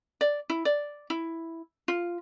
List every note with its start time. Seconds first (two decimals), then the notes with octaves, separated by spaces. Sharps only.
0.21 D5
0.50 E4
0.65 D5
1.10 E4
1.88 F4